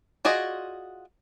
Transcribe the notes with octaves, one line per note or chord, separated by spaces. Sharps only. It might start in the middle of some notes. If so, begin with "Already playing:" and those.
F4 F#4 G#4 D5 D#5